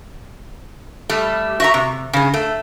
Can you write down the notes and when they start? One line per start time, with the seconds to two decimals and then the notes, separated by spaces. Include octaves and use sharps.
1.09 G3 A3
1.60 F#4 E5 A#5
1.74 C3
2.13 C#3 G#4
2.34 A3